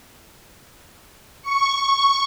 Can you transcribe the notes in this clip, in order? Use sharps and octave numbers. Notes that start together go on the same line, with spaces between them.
C#6